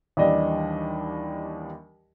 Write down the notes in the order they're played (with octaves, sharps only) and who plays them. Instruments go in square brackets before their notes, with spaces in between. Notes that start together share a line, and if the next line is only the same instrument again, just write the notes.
[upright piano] D#2 E3 G3 D4 D5 D#5